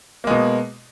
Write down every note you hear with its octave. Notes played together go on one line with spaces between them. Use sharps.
B2 G#3 A#3